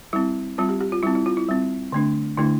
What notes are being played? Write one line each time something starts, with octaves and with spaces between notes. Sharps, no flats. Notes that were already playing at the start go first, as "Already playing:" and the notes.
G3 C4 E4
G3 C4 F4
G4
G4
F4
G3 C4 E4
E4
F4
E4
G3 C4
D3 A3 D4
D3 A3 D4 E4